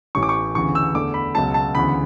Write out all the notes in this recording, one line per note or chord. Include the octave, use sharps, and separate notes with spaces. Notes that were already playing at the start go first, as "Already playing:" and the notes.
A1 A2 E3 C#6
D6
C#6
D2 C#3 E3 B3 C#6
E6
E2 D3 A3 D6
B5
C#2 B2 F#3 A5
A5
D2 C#3 E3 B3 B5